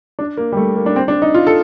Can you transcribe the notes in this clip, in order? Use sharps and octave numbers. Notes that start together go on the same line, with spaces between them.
D4
A#3
G3
A3
A#3
D4
C4
D4
D#4
F4
A4